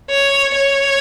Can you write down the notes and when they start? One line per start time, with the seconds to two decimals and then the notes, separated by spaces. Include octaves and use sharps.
0.11 C#5
0.55 C#5